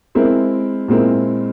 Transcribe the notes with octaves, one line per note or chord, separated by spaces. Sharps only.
G#3 C4 E4 A#4
A#2 G#3 C4 E4 A#4